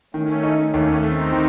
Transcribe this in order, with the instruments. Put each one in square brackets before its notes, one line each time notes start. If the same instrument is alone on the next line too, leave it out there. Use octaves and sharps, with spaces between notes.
[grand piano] D#3 [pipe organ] A3 C#4
[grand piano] D#4
[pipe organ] A3 C#4
[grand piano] D#2
[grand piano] A3 [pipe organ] C4 D#4
[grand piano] D#3